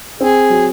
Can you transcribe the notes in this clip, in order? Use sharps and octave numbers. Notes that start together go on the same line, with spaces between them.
C4 G#4
F#3